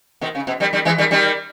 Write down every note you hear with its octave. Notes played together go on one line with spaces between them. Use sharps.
B2 D#3
C#3
B2
D#3 G3
D#3 G3
E3 G#3
D#3 G3
D#3 G3